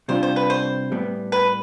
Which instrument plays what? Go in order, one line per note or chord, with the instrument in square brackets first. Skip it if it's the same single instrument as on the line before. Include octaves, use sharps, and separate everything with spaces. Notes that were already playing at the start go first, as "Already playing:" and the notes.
[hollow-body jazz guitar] C3 G3 D4 F4 [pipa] C5
[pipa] C5
B4
C5
[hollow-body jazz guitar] A2 G3 B3
[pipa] B4